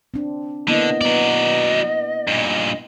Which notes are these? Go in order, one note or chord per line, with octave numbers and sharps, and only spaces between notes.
C4 D4
D3 A#3 B3 E4 D#5
F#3 B3 D5
G2 A#2